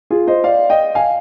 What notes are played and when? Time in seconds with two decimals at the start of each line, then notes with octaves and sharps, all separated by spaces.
0.10 F4 G#4
0.27 C5 D#5
0.44 D5 F5
0.70 D#5 G5
0.95 F5 G#5